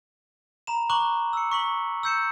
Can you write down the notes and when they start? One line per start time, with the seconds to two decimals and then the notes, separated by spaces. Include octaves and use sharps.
0.67 A#5 B5 E7
0.90 A#5 C#6 D6 F#6 F#7
1.33 E6 C#7
1.51 C#6 B6 F#7
2.03 E6 G6 C#7 E7